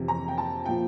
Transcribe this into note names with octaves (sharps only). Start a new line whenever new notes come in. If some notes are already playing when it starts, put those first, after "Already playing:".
Already playing: F2 C3 E3
A#5
G5
A5
A#2 F3 G5